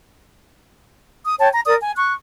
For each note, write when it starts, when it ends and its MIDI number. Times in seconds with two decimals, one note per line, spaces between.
1.25 1.34 87
1.39 1.47 73
1.39 1.47 79
1.39 1.47 81
1.52 1.60 82
1.65 1.75 70
1.65 1.75 74
1.65 1.75 87
1.80 1.92 80
1.96 2.11 85
1.96 2.11 90